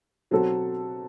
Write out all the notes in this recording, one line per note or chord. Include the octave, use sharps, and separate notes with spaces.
B2 F#3 C4 F#4 A4